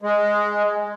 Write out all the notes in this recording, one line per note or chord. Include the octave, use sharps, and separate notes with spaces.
G#3